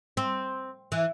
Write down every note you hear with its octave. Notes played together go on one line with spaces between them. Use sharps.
C4
E3